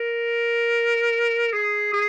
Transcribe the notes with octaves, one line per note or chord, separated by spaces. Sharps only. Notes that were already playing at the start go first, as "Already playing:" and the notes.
Already playing: A#4
G#4
G#4